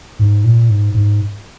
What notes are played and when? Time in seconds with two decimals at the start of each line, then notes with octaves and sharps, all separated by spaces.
0.19 G#2
0.44 A#2
0.69 G#2
0.94 G#2